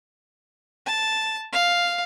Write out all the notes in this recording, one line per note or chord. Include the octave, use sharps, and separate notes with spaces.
A5
F5